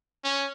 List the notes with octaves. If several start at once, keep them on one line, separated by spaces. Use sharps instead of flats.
C#4